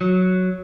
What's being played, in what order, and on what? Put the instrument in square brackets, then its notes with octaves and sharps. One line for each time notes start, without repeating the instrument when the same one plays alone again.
[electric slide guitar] F#3